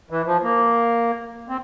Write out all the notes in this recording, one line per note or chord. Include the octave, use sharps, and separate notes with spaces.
E3
F3
A#3
C4